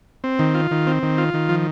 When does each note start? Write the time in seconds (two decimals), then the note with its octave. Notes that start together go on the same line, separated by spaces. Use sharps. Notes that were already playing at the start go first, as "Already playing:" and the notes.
0.24 C4
0.39 D#3
0.54 F4
0.71 D#3
0.87 C4
1.03 D#3
1.18 F4
1.34 D#3
1.49 F3